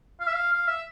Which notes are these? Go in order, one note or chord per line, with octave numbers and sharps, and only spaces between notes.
F5
E5
F5
F5
E5